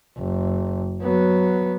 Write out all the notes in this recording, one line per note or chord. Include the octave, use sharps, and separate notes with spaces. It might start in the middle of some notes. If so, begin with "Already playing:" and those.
F#1
F#3 B3